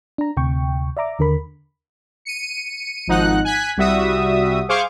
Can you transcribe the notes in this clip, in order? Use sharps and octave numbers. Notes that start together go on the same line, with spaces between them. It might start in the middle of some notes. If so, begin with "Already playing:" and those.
D4 A#5
D2 C3 G5 C#6
D5 E5 A#5 D6
D#2 D3 A#4 B5
C#7 D#7
G#1 F3 D#4 F#5 F#6
G#5 F#6 G#6 B6
C2 G3 F#4 E5 D#6
G#4 C5 F5 C#6 D6